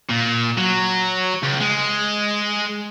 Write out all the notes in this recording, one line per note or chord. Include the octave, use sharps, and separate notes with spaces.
A#2
F#3
C#2
G#3